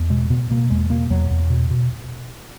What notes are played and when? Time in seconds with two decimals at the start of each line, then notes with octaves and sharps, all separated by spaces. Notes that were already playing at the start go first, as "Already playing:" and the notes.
Already playing: E2
0.10 B2 G#3
0.30 B2 B3
0.51 B2 A#3
0.70 E2 G#3
0.90 B2 A#3
1.10 E2 F#3
1.31 E2
1.50 B2
1.70 B2